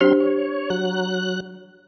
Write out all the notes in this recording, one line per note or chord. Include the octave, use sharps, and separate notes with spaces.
F#3 C4 D4 G4 C5 C6
C#5
F#3 F#6